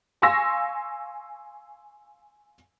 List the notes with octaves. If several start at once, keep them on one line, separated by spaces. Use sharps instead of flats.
F5 G#5 C6 C#6 E6 A#6